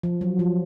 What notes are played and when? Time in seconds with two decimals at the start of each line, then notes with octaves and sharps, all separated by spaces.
0.03 F3
0.21 F#3
0.39 F3